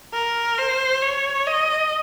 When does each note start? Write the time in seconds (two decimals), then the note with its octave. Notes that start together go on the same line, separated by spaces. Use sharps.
0.13 A#4
0.58 C5
1.02 C#5
1.47 D#5